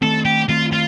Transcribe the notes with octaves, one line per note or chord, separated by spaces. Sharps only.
D#3 A3 C4 A4
G4
D#3 A3 C4 F4
F4